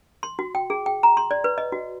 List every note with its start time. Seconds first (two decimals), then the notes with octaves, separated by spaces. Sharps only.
0.23 C6
0.39 F#4
0.55 G5
0.70 G#4
0.86 G5
1.03 A#5
1.17 C6
1.31 D5
1.44 B4
1.58 D#5
1.72 F#4